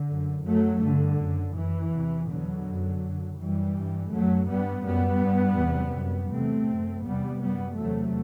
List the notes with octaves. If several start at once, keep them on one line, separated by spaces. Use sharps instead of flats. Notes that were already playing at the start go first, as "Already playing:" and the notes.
Already playing: D3
F#2
F#2 F#3 A3
G2 D3
F#2
F#2 E3
E2 C3
E2 B2 D3 F#3
F#2
F#2
F#2 E3 G3
G2
F#2 F#3 A3
G2 G3 B3
F#2 G3 B3
G2
E2 C3
F#2
E2 C3 A3 C4
F#2
E2 C3 G3 B3
F#2 G3 B3
E2 C3 F#3 A3